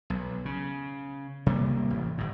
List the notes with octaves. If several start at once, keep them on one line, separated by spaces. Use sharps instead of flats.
B1
C#3
C3 G3 A#3
A1
G1 A2